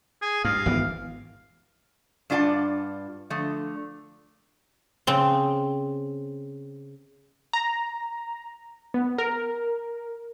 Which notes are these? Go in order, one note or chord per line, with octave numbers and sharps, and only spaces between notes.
G#4
G2 F5
G#1 E3 B3
G2 D4 F4 D5 F#5 A5
D3 F3 A3
C#3 C4
A#5
B3
A#4